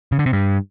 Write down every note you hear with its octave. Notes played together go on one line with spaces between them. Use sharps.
C#3
D3
C3
G2